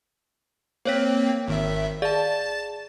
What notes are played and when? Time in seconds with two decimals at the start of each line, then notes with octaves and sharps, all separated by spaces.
0.85 A#3 C4 C5 C#5 B6
1.48 G#1 D#3 E5
2.02 G#4 D5 F5 A5 A6